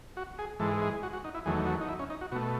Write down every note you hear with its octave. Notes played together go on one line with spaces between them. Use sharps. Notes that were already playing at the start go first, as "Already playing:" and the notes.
F#4
G#4
G#2 E3 G#3 A4
G#4
F#4
F#4
D#4
E4
E2 D#3 F#3 A3 G#4
F#4
D#4
E4
C#4
D#4
F#4
B2 A3 F#4